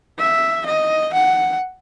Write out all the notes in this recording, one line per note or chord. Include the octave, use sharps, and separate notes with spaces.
E5
D#5
F#5